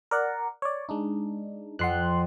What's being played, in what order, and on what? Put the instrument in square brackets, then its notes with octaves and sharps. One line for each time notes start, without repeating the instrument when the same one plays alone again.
[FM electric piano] A#4 D5 F#5
C#5 D5
G#3 D4 D#4
[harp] F2 [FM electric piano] F#5 C6 F#6